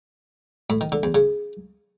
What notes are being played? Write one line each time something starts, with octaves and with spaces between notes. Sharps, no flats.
A2
D#3
D3
E2
C#3